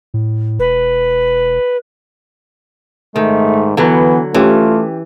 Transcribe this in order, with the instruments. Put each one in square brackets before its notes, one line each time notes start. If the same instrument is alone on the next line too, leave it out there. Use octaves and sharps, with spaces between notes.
[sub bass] A2
[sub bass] E1 [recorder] B4
[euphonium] G#2 [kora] D#3 [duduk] A3
[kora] D3 F#3 [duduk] E3 [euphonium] B3 [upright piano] F#4 B4 B5
[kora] E3 [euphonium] A3 [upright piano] C#4 G4 [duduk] F4